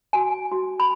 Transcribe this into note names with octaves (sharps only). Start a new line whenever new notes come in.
F#4 G#5
F#4
B5